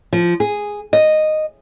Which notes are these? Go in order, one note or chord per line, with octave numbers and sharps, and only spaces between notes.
F3
G#4
D#5